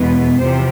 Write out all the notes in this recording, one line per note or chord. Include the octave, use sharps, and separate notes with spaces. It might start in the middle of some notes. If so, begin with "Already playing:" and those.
Already playing: E2 B2 G#3 B3
E2 C3 F3 C5